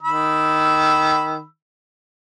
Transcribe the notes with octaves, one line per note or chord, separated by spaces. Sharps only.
D#3 B5 E6